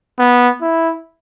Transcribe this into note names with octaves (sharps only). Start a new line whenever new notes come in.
B3
E4